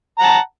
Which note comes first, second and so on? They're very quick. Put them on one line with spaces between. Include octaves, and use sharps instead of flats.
A#5 F#5 A5